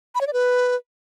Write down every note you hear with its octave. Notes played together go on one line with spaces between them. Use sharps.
B5
C#5
D5
B4